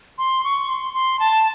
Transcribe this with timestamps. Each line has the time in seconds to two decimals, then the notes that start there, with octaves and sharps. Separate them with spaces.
0.18 C6
0.44 C#6
0.69 C6
0.94 C6
1.20 A5